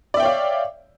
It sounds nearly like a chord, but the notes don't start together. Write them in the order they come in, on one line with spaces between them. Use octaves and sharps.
D5 E5 G5 C#5 F5